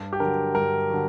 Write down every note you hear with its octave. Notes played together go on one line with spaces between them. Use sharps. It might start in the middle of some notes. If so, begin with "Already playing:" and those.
Already playing: G2
G4
D3 F#3 A#4
G2 A#4
D3 F#3